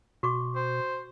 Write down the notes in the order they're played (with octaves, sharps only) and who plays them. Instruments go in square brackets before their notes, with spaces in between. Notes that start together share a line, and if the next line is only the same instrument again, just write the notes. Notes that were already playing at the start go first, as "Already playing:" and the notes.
[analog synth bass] B2 [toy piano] F#4 C#6 D6
[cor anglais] C5